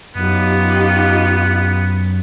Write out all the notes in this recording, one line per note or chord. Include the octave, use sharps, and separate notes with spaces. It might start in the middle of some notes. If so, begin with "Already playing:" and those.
F#2 B3 D#4 F4 G4